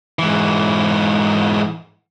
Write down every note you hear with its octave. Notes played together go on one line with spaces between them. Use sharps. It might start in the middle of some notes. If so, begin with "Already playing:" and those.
G#2 E3